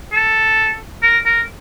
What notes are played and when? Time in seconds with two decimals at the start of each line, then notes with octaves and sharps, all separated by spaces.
0.13 A4
1.02 A#4
1.25 A#4